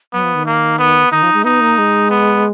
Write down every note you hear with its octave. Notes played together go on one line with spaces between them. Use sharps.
F#3 B3
F3
D#3
A#3
B3
D#3 D#4
F3
G#3
B3 D#4
A#3
G#3
B3